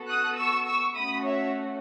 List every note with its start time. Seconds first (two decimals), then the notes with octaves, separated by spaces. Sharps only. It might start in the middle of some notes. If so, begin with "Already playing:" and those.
Already playing: B3 F#4 A4
0.08 D#6 F#6
0.37 C#6 E6
0.66 C#6 E6
0.94 A3 C#4 F#4 B5 D#6
1.24 C#5 E5